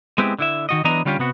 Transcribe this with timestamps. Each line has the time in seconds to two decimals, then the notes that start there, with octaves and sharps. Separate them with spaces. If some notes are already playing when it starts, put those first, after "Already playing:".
0.18 G#3 B3 C4 E4 G4
0.39 D3 E4 E5
0.69 D#3 F#4 D#5
0.84 E3 F#3 B3 D4 D#5 A#5
1.05 D3 G3 C#4 F4 G4
1.19 C3 B3 F#4